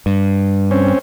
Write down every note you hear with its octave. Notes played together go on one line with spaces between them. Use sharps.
G2
C4 C#4